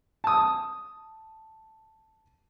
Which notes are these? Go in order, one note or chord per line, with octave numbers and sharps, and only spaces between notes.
A5 D#6